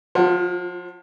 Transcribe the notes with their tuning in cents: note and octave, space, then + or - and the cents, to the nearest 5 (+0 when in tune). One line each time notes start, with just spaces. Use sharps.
F3 +35 F4 -10 F#5 +0